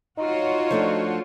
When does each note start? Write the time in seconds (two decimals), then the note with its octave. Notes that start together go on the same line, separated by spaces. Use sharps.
0.18 D#4 F4 F#4 C#5
0.71 F3 A3 D4